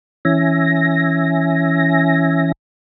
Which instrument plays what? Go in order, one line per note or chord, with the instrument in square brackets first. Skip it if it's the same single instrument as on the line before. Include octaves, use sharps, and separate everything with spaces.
[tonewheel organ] E3 C#4 E5 G#5 A#6